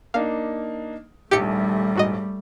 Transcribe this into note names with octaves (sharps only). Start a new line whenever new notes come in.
A#3 D4 D#4 F5
D#1 A#1 D#2 G3 A3 G4 C#7
G#2 F#4 D#5